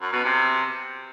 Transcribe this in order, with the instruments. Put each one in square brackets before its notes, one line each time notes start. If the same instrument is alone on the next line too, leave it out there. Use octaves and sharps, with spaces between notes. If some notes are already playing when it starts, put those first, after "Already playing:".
[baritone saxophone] F#2
B2
C3